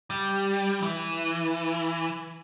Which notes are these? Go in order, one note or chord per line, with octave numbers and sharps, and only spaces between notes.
G3
E3